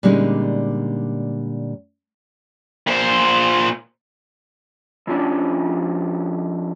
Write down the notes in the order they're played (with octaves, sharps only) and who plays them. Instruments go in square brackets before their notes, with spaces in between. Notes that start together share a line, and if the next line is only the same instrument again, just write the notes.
[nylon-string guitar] A#2 D3 G3 G#3 C#4 D#4
[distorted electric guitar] A#2 C5
[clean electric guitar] F2 F3 C#4 D4